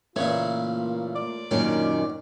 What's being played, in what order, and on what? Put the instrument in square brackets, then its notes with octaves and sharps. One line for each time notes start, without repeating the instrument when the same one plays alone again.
[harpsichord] A#2 C#3 E3 [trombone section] A3 A#3 F4 [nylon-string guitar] C#5
[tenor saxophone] D5
[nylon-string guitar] F#2 A#2 D#3 [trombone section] A#3 D4 [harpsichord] C#4